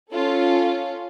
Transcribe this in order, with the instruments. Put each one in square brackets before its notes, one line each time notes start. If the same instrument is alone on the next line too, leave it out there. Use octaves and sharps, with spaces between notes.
[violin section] C#4 F4 A4